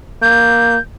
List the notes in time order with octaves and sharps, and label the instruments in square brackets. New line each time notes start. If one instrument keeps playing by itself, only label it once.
[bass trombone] A#3 [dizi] G6